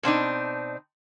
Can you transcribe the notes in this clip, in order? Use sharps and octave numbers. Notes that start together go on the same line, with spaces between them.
B2 C4 D4 D#4